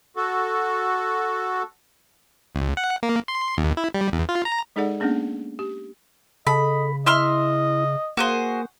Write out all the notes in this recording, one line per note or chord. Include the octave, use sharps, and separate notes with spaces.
F#4 A4
C#2
F#5
A#3
C6
D#2
E4
G3
E2
F4
A#5
G#3 D#4 G#4 A4 D5 F#5
A#3 B3 C#4 D4 G#4
G4
C#3 A4 D#5 B5
E4 D#5 E5 C6 F6
A#3 F#4 G#4 C5